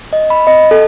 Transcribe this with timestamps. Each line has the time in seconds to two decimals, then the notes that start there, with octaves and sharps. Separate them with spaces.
0.13 D#5
0.30 B5
0.47 D#5
0.71 A4